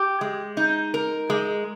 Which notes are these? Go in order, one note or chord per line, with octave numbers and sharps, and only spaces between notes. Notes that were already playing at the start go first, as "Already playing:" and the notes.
Already playing: G4
G#3
D#4
A#4
G#3